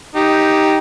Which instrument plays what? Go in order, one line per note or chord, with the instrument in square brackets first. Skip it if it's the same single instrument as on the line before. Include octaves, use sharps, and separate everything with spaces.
[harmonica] D#4 G4